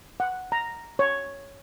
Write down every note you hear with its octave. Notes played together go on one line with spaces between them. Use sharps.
F#5
A#5
C#5